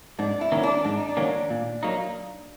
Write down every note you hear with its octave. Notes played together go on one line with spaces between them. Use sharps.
G#2 D4
E4
D#3 F#3 A#3 C#4
D4
G#2 D4
D#4
D4
D#3 F#3 A#3 C#4
A#2
F#3 A#3 D#4